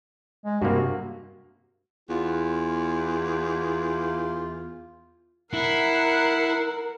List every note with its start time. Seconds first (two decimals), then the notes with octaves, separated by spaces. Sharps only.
0.45 G#3
0.62 G2 C3 A#3 F#4
2.09 E2 F4
5.54 E4 A#4 F#5 C7